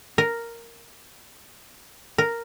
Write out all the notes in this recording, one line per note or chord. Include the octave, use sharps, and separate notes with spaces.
A#4
A#4